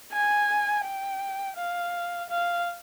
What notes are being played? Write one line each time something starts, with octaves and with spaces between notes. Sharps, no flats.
G#5
G5
F5
F5